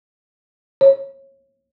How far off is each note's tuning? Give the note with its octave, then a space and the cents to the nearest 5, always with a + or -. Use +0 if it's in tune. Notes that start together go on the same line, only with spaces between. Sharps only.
C#5 -25